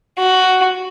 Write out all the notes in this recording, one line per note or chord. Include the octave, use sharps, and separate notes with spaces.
F#4